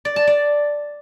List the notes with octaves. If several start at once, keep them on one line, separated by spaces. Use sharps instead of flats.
D5
A5
D5